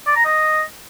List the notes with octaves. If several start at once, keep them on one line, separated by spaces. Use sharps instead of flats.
D5
A#5
D#5